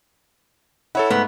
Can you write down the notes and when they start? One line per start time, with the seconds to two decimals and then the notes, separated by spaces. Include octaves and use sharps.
0.95 E4 A4 C#5 F#5
1.10 G#2 A3 B3